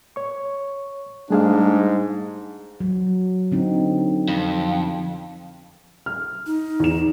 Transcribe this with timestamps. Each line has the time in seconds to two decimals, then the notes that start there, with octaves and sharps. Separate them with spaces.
0.16 C#5 C#6
1.30 G#2 G3 A3 D4 G#4 F5
2.80 F#3
3.52 D3 C4 D#4
4.29 F2
6.06 F6
6.47 D#4
6.80 E2 E7